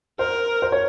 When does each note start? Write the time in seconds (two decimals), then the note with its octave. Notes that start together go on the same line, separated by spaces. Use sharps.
0.19 A#4 C5
0.62 C5
0.72 C#5